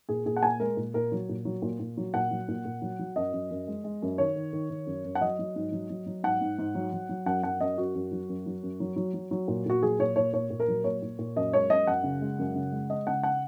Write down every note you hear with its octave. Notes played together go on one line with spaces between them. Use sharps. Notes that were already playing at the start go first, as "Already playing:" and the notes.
A#2 G#4
A#2 G#4
F#5
A#2 G#5
G#3 A#4
A#2
A#2 A#4
F#3
A#2
F#3
A#2
A#2
F#3
A#2 F#5
F#3
A#2
A#2
F#3
F#3
F#2 D#5
F#2
F#2
G#3
G#3
F#2
D#3 C#5
D#3
D#3
D#3
F#2
F#2
F#5
F#3 D#5
F#3
G#2
F#3
F#3
F#3
G#2 F#5
G#2
G#2
F#3
F#3
F#3
F#2 F#5
F#2 F#5
F#2 D#5
F#2 F#4
F#2
F#3
F#2
F#3
F#2
F#3
F#3
F#3
F#3
A#2
A#2 F#4
F#3 G#4
A#2 C#5
A#2 C#5
A#2 C#5
A#2
A#4
F#3
A#2 C#5
A#2
A#2
F#2 D#5
G#3 C#5
F#2 D#5
F#2 F#5
C#3
G#3
F#2
C#3
G#3
G#3 D#5
C#3 F#5
F#5